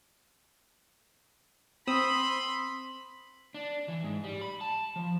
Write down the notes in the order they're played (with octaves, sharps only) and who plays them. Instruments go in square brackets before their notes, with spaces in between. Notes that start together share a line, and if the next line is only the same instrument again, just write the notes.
[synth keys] C4 D#6 E6 [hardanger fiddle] B5 C6
[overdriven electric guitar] D4
E3
G#2
G3
B5
A5
F3